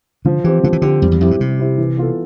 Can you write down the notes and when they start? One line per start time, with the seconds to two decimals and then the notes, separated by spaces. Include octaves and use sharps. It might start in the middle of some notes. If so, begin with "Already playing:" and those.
0.25 D3 F3
0.44 E3 C4 G4
0.64 D3 F3
0.73 E3
0.82 D3 C4 G4
1.02 F2 G3
1.11 E2
1.21 F2 C4 E4 G4
1.31 G2
1.39 C3 G3
1.59 C4 E4 G4
1.78 E3
1.97 B3 F4 A4